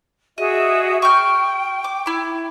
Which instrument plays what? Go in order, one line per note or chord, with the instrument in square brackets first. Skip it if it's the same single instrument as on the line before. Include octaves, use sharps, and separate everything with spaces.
[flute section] F#4 G#4 E5 [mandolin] D#5
[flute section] G5 [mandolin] C#6 F6 G6
[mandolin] D6
E4 D6